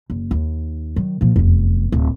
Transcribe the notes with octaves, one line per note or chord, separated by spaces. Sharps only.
F#1
D#2
D#3 F#3
A#2 F3
F1 E2
D1